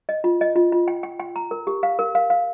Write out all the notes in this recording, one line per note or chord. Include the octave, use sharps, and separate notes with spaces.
D#5
F4
D#5
F4
F4
G5
G5
G5
A#5
A#4
G4
F5
A#4
F5
F5